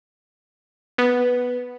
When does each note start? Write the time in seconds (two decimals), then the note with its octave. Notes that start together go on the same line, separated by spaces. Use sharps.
0.98 B3